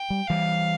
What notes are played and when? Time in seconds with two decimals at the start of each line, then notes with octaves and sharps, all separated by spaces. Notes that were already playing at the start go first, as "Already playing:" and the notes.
Already playing: G5
0.10 G3
0.28 E3 G3 F5